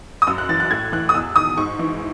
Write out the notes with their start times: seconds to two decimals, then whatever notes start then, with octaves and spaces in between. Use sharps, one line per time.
0.22 D#6
0.27 F#2 E6
0.38 F#6
0.49 E3 A6
0.60 F#6
0.71 A2 G#6
0.92 E3 F#6
1.09 D#6
1.14 E2 E6
1.36 D#3 D#6
1.58 G#2 C#6
1.79 E3